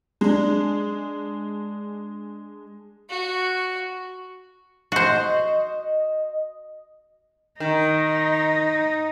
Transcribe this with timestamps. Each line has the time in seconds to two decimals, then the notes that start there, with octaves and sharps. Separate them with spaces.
0.21 G#3 D4
3.10 F#4
4.92 F#4 C5 D#5
7.60 D#3 D#4